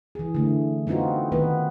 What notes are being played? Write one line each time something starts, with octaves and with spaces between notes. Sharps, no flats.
E3 G#4
D3 A3
B3 C4 D#4 F4 F#4
D#3 B3 B4